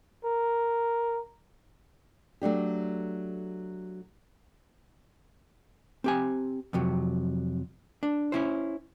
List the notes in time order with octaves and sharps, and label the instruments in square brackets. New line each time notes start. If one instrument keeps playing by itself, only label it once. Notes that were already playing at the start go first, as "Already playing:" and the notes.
[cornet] A#4
[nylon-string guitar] F#3 A3 D4 G4
[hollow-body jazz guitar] C4 G4 G#5
F2 C3 F#3
D4
C#4 E4 C5